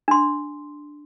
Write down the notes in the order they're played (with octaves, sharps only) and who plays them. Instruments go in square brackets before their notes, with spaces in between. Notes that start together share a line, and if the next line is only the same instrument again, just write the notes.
[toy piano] D4 C6